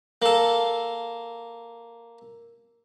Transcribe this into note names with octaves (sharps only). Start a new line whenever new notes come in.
A#3 A4